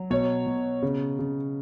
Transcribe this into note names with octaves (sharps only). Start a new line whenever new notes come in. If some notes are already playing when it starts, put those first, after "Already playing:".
Already playing: F#3
B2 C#5
B2
C#3
C#3